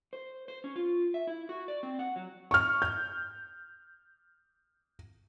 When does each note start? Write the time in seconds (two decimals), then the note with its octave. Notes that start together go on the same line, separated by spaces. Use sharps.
0.13 C5
0.48 C5
0.64 C#4
0.76 F4
1.14 E5
1.27 E4
1.49 F#4
1.68 D5
1.83 C4
1.99 F#5
2.16 F#3
2.51 C#6 F6
2.82 G6